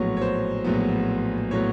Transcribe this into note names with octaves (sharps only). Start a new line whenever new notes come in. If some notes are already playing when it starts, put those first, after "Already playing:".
Already playing: A#1 A2 F#3 B3 C#5
C#5
C5
A#1 A2 F#3 B3
A2 F#3 B3 C#5